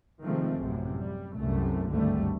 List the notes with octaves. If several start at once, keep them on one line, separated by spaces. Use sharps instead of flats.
C3 D#3 F3 G#3 A3 C4
A1 F#2 C3
G3
C2 F#2 C3 A3
G#1 D2 G2 D3 G3 A3